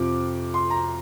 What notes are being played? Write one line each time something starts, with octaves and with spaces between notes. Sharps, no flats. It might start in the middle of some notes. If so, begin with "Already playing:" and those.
Already playing: F2 C3 F3 D6
C6
A#5